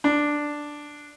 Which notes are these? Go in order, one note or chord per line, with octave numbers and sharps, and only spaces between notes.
D4